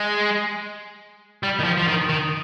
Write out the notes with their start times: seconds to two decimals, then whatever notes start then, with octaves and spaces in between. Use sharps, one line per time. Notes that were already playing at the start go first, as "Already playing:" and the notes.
Already playing: G#3
1.43 G3
1.59 D#3
1.64 F3
1.77 F3
1.88 D#3
2.09 D#3